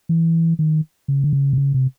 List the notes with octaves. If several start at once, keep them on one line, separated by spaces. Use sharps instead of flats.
E3
D#3
C#3
D3
C#3
C3
C#3
C3